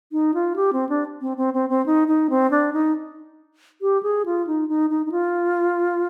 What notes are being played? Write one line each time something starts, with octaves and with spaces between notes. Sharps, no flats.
D#4
F4
G4
C4
D4
C4
C4
C4
C4
D#4
D#4
C4
D4
D#4
G4
G#4
F4
D#4
D#4
D#4
D#4
F4